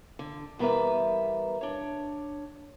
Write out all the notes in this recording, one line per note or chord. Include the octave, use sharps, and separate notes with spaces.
D3
E2 G3 B3 A#4 B4 E5
D4 C#5